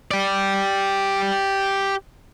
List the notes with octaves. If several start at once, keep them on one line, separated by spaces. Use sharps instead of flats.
G4 D5